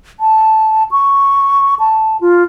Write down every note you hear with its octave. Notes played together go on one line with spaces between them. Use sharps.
A5
C#6
A5
F4